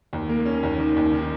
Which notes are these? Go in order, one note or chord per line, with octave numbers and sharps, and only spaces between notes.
D#2
A#3
C#4
D#2
D#3
D#2
D#3